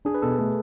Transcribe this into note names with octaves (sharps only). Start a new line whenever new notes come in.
D4 G#4
B4
B2 A4
A3